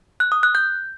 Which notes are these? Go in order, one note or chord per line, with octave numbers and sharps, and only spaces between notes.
F#6
D#6
F#6
G6